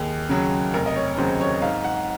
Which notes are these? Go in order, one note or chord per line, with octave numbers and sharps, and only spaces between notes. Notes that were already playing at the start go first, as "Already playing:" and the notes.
Already playing: D#2 G#4
C#3 F#3
F1 A#4
D#5
C#5
D#2 C#3 F#3 C5
C#5
G#2 F5
F#5